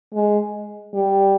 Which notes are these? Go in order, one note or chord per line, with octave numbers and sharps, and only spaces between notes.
G#3
G3